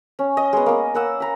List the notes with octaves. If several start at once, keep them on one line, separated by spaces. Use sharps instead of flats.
C#4
D#5
G#3 B3
A#3 B3
A#3 F#5 E6
A#5 B5